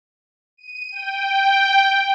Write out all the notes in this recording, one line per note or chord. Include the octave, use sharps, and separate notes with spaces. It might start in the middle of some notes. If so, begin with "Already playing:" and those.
D#7
G5